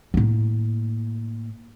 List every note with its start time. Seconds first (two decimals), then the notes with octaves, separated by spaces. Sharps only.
0.14 A2 A#3